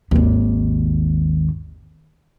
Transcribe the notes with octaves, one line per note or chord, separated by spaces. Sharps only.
G#1 D#2